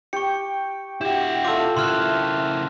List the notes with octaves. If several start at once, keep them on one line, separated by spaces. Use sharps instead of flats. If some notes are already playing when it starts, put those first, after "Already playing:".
G4 C#6 C#7
E4 F#4 G4
A3 F4 D6 E6
C#3 E4 C6 F6 F#6